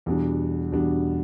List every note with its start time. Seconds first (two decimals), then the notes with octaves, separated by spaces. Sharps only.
0.06 E2 B2 G3 D4
0.72 E2 B2 G3 D4